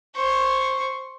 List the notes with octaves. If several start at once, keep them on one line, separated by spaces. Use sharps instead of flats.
C5 C#6